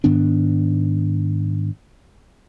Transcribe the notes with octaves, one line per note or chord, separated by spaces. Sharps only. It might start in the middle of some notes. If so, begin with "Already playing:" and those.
G#2 D#3 B3 D4